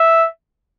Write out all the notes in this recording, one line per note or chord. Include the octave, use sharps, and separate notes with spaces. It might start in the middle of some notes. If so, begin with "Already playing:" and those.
Already playing: E5